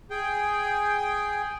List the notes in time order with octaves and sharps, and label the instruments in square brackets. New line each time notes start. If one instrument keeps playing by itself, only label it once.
[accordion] G#4 G5